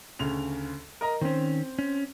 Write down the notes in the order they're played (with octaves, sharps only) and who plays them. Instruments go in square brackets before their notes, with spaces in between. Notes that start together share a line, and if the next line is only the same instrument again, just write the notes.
[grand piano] D2 C#3 F7
A#4 D#5 A#5
[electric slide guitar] D#3 C#4 [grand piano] C4 C5
[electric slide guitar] C#4